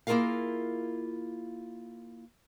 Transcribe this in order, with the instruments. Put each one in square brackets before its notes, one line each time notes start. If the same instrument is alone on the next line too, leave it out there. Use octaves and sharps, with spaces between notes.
[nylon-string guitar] A#3 E4 F4 G#4 A#4 F5